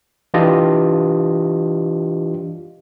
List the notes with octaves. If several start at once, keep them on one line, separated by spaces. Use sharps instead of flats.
E3 D4 F4 G4 D#5